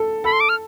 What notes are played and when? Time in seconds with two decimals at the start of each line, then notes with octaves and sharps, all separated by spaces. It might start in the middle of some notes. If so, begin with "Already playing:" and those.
Already playing: A4
0.24 A4 B5
0.32 C6
0.40 D6
0.49 F6